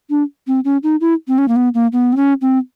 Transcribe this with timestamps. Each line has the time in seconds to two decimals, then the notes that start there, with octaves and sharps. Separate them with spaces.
0.10 D4
0.47 C4
0.65 C#4
0.83 D#4
1.01 E4
1.28 C4
1.38 C#4
1.48 A#3
1.56 B3
1.74 A#3
1.92 B3
2.13 C4
2.16 C#4
2.41 C4